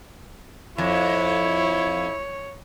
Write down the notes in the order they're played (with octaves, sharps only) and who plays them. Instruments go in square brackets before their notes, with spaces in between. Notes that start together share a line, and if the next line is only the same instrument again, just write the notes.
[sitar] F2 [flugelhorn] E4 [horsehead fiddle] C#5